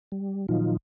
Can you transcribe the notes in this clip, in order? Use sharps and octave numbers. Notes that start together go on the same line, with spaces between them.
G3
A#2 D#3 F3 F#3 D#4 F4